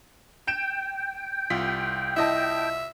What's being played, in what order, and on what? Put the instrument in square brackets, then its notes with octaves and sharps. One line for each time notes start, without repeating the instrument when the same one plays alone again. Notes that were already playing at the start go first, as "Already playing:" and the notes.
[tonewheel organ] G5 [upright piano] G6 D7 E7
[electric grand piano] C2 F4 B6
[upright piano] E4 D#5 A5 [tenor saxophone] E5